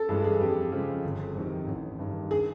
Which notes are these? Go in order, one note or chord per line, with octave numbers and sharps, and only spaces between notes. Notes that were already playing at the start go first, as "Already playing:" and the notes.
Already playing: A4
G2 E3 G#3 C#4 G#4
G#4
F2 G4
C#3 F3 G#3 C4
G1
F2 C3 D#3
A1
G2 D#3
G#4